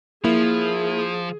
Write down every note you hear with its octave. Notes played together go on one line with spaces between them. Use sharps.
F3 A#3 E4 G#4